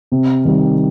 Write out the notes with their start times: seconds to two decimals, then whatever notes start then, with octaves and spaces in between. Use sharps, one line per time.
0.12 C3
0.45 D#3 G3